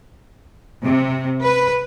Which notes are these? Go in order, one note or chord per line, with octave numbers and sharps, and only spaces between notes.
C3
B4